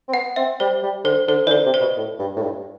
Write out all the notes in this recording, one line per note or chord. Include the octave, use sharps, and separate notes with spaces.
C4
B3 F#5
C4 E5
G3 C5
G3
D3 C5
D3 C5
E3 D5
D3 C5
C3
C5
B2
A2
G2
A2
G2